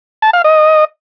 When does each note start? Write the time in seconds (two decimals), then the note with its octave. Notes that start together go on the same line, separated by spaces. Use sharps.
0.22 A5
0.33 F5
0.44 D#5